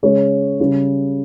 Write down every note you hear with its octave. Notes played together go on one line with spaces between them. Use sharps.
C#3 G#3 C#4 C#5
C#3 G3 C#4